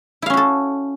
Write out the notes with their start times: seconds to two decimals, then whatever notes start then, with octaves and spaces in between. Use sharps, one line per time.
0.22 E4
0.26 F5
0.30 C#4
0.33 F#4
0.37 A4